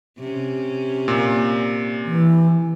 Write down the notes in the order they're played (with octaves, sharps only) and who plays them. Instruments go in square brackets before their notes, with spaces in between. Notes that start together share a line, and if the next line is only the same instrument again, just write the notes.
[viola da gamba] C3 C#4
[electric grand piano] A#2
[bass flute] E3